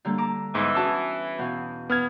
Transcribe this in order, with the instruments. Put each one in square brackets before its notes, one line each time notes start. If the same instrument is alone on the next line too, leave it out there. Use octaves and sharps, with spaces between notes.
[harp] D3 G3 A#3
A5 A#5 D6
[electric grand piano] G#2 [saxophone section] E3 [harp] B3 D6 E6
[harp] C#4 F#4 G#4 [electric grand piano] A5 E6
[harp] E2 B2 F5
[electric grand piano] B3 F6 G#6